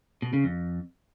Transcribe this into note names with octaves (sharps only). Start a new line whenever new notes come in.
B2
C#3
F2